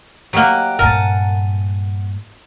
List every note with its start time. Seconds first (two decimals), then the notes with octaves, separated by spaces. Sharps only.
0.33 F#3 A#3 G4 D#5 F#5
0.79 G2 A#2 A#4 F#5 G#5 A5